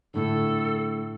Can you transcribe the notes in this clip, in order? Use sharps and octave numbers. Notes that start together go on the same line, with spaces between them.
A2 D3 A4